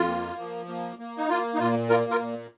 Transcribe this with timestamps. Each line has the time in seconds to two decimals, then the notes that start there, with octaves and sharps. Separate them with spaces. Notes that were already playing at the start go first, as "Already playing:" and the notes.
Already playing: F2 F4
0.08 A#3
0.39 F3
0.68 A#3
0.99 A#3
1.17 D#4
1.29 A#3 F4
1.55 D#4
1.59 A#2 F4
1.90 A#3 F4 A#4
2.11 F4 A#4
2.20 A#2